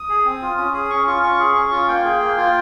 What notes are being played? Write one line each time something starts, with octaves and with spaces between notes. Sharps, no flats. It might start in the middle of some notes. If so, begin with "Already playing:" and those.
Already playing: D#6
G#4
C4
F4
C#4 D#6
G#4 D#6
C#4 C#6
F4 C#6
C#4 C#6
G#4
C#4 C#6
F4
A#3 G5
G#4
A#3
F4